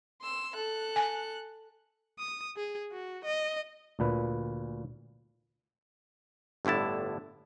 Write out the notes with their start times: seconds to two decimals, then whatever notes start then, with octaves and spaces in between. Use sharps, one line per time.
0.22 C6 E6
0.55 A4 F#6
0.96 G#5
2.19 D#6
2.57 G#4
2.92 F#4
3.25 D#5
3.99 D2 A#2 B4
6.65 G1 A2 D3 E4 A5